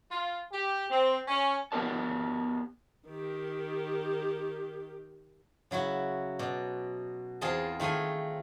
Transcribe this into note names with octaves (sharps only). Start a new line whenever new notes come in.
F4
G4
C4
C#4
B3 G4 A#4 D5 A5
D#3 G4
C#3 F#3 E4 F#4
B2 D5
E2 C4 F4 G#4 D#5 A5
D#3 A3 F4 G#4 G#5